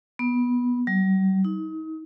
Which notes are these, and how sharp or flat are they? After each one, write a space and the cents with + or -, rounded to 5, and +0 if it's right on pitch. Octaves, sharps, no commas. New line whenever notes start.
B3 -10
G3 -45
D#4 +35